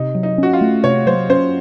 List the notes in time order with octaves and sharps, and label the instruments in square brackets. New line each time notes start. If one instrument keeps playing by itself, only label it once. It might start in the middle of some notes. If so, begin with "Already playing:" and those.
Already playing: [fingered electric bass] C3 [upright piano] D#4
[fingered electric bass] F#3
[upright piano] D#4
[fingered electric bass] C#4 [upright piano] F#4
[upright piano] F4
[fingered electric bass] A3
[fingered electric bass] C3 [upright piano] C#5
[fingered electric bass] F#3 [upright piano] C5
[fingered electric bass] C#4 [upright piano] C5